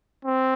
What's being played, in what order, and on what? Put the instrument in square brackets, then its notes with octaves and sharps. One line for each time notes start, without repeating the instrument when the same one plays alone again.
[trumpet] C4